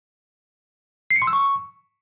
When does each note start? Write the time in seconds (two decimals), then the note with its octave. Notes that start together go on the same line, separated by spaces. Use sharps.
1.11 C7
1.16 C#7
1.22 C6
1.27 E6
1.33 C#6